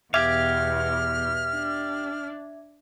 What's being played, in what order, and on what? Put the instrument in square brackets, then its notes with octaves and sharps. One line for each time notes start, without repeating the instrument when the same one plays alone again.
[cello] E2 B2 [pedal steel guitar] G4 F5 [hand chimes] E5 D6 G#6 [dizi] F6
[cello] D4